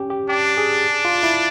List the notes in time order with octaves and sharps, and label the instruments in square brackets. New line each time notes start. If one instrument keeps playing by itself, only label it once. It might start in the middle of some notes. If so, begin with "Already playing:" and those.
Already playing: [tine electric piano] C#4 G4
G4
[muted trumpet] D4 [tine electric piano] G4
[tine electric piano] G#4
F4
E4